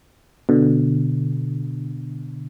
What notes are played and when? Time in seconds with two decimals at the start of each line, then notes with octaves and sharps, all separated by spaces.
0.49 B2 D3